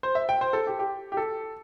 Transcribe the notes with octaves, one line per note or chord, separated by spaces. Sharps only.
C5
E5
G5
C5
A4
G4
G4
G4
A4